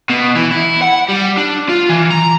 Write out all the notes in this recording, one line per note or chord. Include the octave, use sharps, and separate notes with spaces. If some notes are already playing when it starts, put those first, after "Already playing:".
B2
E3
E4
F#5
G3
D4
F4
E3
A#5